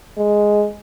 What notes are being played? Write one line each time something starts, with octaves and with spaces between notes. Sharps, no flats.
G#3